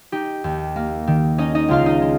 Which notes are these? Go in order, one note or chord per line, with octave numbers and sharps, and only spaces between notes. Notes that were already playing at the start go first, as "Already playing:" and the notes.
D#4 G4
D#2
A#3
D#3
C#4 D#4 D#5
D#4 D#5
C#2 F4 F5
D#4 D#5
G#3